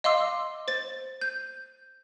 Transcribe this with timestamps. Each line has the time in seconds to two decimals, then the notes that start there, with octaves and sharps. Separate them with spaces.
0.04 D#5 F5 C6 D6 E6
0.68 C5 A6
1.21 G6